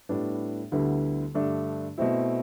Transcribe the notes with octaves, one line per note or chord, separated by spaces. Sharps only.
A2 G3 B3 D4
D2 D3 G3 B3 E4
G2 D3 A3 D4
B2 A3 C4 E4